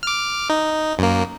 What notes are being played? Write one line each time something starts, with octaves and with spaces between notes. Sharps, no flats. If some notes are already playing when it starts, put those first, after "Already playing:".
D6 F6
D#4
F#2 A#3